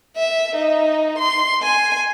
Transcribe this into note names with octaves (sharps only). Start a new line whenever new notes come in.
E5
D#4
C6
G#5